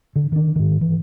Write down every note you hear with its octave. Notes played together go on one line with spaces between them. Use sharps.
D3
D#3 D4
G#2 D#3
E3